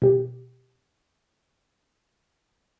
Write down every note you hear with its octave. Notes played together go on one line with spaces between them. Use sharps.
B2 G4